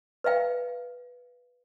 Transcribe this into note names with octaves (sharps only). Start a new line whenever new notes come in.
B4 D#5 F5 G5